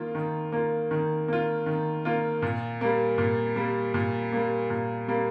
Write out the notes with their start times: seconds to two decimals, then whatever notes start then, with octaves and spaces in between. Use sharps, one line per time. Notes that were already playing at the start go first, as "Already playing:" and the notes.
Already playing: D#3 A#3 F4
0.15 D#3
0.52 A#3 F4
0.91 D#3
1.28 A#3 F4
1.66 D#3
2.05 A#3 F4
2.42 A#2
2.81 G3 A#3
3.18 A#2
3.56 G3 A#3
3.94 A#2
4.33 G3 A#3
4.70 A#2
5.08 G3 A#3